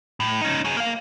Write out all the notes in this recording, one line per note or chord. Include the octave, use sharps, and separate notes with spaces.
A2
C#4 D#4
F#3 G#4
A#3 F5